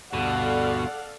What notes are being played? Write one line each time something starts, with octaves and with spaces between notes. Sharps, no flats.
D2 G2 B2 A4 D5 F5 F#5